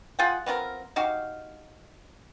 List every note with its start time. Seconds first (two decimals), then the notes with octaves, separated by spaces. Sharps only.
0.19 F4 G#4 F#5 G5
0.46 B3 C4 F4 A#4
0.96 D#4 F#4 G4 F5